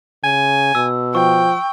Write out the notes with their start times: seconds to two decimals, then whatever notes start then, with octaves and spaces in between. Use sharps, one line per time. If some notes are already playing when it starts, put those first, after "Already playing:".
0.24 C#3 G#5
0.75 B2 E6
1.15 F3 G5 C#6